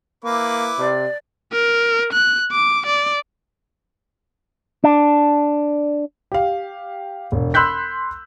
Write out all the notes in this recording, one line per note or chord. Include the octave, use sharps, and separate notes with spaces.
A#3 E4 B4 D6
C3 D5
A#4
F#6
D6
D5
D4
G4 F5
E1
B5 C6 E6 F#6 G6 B6